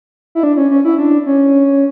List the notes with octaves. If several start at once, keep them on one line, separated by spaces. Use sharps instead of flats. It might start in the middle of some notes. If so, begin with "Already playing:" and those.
E4
D4
C#4
C#4
E4
D4
C#4